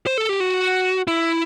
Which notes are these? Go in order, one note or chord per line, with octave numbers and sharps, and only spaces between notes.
C5
A4
G4
F#4
E4